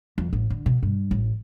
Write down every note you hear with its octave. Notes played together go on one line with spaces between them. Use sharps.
F2
A1
D3
B2
G2
A1